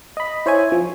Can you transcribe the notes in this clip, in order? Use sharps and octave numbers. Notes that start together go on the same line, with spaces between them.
D#5 B5
E4 C5 C#5 E5 G#5
F3